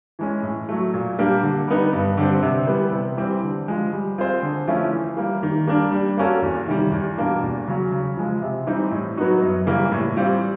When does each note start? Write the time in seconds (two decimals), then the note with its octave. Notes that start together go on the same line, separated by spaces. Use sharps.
0.19 E3 G#3 C#4
0.43 A2
0.69 F#3 A3
0.94 A#2
1.19 G3 A#3 D4 G4
1.43 D3
1.68 G3 B3 D#4
1.93 G2
2.17 D3 G3 C4
2.42 C3
2.67 E3 G3 B3
2.92 C3
3.17 E3 G3 C4
3.43 D3
3.68 F3 G#3
3.93 G3
4.18 C4 F4 G#4 C5
4.43 D3
4.67 F3 A3 C#4 E4
4.93 E3
5.17 G3 A#3
5.43 D#3
5.67 G3 A#3 D4
5.92 G3
6.17 A#3 C#4 F#4 A4
6.42 E2
6.67 C3 D#3 G3
6.92 E2
7.17 B2 G3 A#3 D4
7.42 E2
7.68 C#3 F#3
7.92 C#3
8.17 F3 G#3
8.42 C3
8.66 E3 G3 C4 D#4
8.91 A2
9.17 F#3 B3 D#4 F#4
9.42 F#2
9.66 C#3 E3 G3 A#3
9.92 A2
10.16 E3 G3 C4 F4